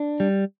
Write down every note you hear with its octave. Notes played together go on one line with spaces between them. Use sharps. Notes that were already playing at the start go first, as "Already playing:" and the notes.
Already playing: D4
G3